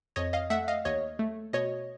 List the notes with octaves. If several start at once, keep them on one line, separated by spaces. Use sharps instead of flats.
F2 C#5 D#5
D#5 F5
A3 E5 F#5
D#5 F5
D#2 C#5 D#5
A3
B2 C#5 D#5